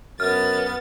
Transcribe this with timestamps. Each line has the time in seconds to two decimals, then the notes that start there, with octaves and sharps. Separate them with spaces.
0.20 F#2 B3 F6 A6